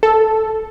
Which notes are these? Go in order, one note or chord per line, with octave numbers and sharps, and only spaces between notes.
A4